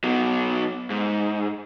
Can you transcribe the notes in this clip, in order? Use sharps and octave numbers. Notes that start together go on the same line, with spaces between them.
B2 F#3
G#2